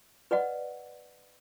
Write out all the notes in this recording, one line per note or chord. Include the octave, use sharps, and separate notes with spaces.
B4 D5 D#5 F#5